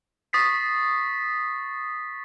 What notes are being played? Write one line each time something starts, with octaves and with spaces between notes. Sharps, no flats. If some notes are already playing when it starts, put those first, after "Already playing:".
C#6 D#6 A6 B6 C7